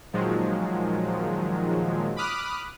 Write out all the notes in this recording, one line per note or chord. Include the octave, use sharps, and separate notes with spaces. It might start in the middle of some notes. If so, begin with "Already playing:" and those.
A#2 D#3 F3 F#3 G#3
B5 D6 D#6 F6 F#6